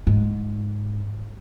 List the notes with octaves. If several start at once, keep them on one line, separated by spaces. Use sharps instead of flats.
G#2